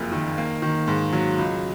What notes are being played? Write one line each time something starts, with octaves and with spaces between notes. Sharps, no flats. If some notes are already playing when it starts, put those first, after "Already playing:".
Already playing: F#1 F2 A#3
D#3
A#3
D#3
G#2
F#3
C#2